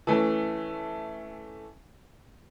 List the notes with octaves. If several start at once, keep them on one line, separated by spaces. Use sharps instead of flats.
E3 A3 C#4